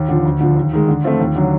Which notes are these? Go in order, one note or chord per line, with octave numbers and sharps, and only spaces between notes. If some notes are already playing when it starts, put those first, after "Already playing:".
Already playing: D#2
D3 F3
D2
D3 F3
D#2
D#3 G#3
D3
F3 A3 C4 F4
D#2
D3 F#3